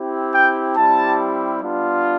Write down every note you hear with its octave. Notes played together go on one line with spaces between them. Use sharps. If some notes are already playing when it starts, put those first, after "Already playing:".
Already playing: C4 E4 G4
G5
G3 C4 E4 G4 A5
G3 B3 D4 F4